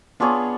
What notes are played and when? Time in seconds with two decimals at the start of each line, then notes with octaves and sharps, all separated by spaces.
0.20 B3 D4 F4 G#4 C#5